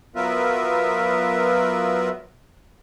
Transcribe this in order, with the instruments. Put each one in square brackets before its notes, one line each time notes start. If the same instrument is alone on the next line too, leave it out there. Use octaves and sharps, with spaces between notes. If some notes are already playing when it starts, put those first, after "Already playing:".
[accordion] F#3 B3 F4 A#4 B4 E5